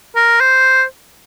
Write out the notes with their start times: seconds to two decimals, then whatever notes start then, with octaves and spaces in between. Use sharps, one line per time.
0.16 A#4
0.40 C5